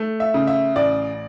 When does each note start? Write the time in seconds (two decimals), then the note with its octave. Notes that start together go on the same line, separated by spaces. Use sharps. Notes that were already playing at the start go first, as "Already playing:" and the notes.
Already playing: A3
0.20 E5
0.34 C#3
0.47 E5
0.76 A1 D5